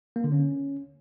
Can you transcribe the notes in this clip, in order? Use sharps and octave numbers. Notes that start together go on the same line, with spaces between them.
A#3
D3
C#4